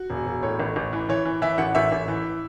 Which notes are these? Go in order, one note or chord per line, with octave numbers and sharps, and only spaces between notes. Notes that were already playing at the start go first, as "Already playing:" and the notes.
Already playing: F#4
E1
E1
A2 C#5
A1
A1
E3
E3 C#5
E3
E3 E5
A1 F#5
A1 E5
A1
E3